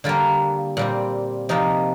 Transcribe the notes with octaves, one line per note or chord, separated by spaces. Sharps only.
D3 G3 A#3 F4
A#2 G3 C4
C3 F3 A#3 D#4